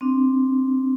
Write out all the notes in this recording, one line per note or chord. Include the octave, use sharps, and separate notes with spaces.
C4 D4